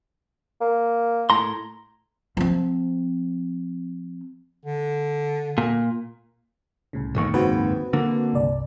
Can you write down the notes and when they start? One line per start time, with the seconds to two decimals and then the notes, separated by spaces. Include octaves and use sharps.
0.61 A#3
1.30 A2 A#5 C6
2.37 F3 C4
4.65 D3
5.58 A#2
6.93 C2 A2 C#3
7.15 E1 A1 D#2 G#2 C#6
7.34 F#1 D#2 G#2 C4 F#4 B4
7.93 D3 A#3
8.33 G1 C2 D5